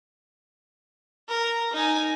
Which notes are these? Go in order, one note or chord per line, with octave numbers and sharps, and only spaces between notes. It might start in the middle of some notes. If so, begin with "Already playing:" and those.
A#4
D#4 G#5